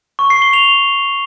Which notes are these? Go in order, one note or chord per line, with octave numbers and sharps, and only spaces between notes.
C#6
C7
G7
F7